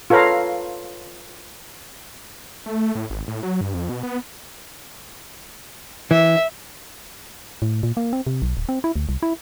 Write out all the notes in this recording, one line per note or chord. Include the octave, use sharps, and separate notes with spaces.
F4 A4 B4 C#5 F5 A#5
A3
A3
A2
G#1
A2
F#3
G2
F2
B2
B3
E3 E5
A2
A#2
A#3
C4
C3
B1
D1
C4
E4
D2
C2
E4